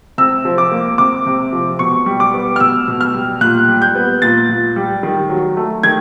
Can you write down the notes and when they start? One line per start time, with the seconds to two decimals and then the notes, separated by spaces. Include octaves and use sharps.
0.18 C3 E6
0.45 F3
0.58 D6
0.71 A#3
0.98 C3 D6
1.26 C3
1.53 F3
1.79 B2 C#6
2.06 G3
2.20 D6
2.34 B3
2.56 F6
2.60 B2 E6
2.88 B2
3.01 F6
3.14 G3
3.41 A#2 F#6
3.68 G3
3.82 G6
3.95 B3
4.22 A#2 A6
4.49 A#2
4.76 G3
5.03 D#3
5.29 F#3
5.57 A3
5.83 D#3 G#6